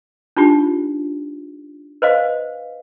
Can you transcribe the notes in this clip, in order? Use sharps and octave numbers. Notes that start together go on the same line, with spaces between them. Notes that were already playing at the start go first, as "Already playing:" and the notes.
D4 D#4 F4 G4
B4 C5 D#5 F5